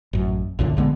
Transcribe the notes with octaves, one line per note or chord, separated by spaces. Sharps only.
A1 F#2
B1 F#2 A#2 D3
A#1 D3 G#3 B3